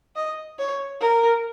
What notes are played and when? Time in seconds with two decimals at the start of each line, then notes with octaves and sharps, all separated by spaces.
0.16 D#5
0.59 C#5
1.01 A#4